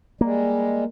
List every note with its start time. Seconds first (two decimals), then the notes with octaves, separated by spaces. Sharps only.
0.21 G3 G#3 A#3